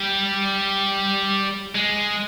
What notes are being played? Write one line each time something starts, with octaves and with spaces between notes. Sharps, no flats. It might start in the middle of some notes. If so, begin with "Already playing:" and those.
Already playing: G3
G#3